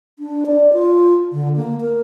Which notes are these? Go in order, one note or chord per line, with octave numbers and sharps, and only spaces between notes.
D4
D5
F4
D3
A#3
A#4